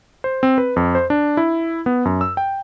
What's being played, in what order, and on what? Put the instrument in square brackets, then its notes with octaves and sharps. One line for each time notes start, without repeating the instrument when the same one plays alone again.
[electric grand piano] C5
C4
B4
F2
C5
D4
E4
B3
F#2
E6
G5